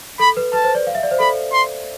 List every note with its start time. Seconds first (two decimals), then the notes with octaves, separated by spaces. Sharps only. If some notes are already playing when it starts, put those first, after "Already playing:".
0.19 A4 B5
0.37 B4
0.53 B4 A5
0.64 C5
0.75 D5
0.87 F5
0.95 E5
1.03 D5
1.11 C5
1.19 A4 B5
1.53 C6